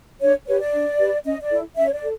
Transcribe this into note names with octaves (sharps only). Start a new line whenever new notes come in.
D4 C#5
G4 B4 C#5
D5
D4
G4 B4
C#4 D#5
D5
E4 A4
C#4 E5
C#5
D5
A4